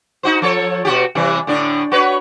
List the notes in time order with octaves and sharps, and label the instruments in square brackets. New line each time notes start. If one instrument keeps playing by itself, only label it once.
[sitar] D#4 F#4 C5
F3 A4 C#5
B2 F#4 G4
C3 E3 G3
A2 D3 D4
F#4 B4 C#5